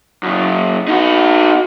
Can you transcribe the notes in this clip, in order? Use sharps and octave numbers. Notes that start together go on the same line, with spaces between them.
F#2 C#3
D#4 F#4